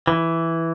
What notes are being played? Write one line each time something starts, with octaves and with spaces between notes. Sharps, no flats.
E3